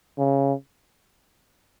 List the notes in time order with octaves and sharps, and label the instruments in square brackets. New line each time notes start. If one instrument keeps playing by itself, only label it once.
[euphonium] C#3